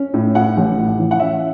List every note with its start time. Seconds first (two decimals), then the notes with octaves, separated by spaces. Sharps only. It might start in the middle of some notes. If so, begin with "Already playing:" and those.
Already playing: C#4
0.14 A2
0.35 A2 F#5
0.57 A1
0.78 A2
0.99 E3
1.11 F#5
1.20 C#4 E5